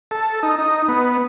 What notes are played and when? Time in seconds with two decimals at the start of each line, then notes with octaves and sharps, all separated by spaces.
0.11 A4
0.43 D#4
0.58 D#4
0.88 B3